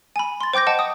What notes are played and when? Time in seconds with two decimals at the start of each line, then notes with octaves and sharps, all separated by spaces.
0.16 G#5 B5
0.41 C6 A6
0.54 C5 G5 D6 G6 A#6
0.67 C5 D#5 F#5 G5 A5
0.79 D#6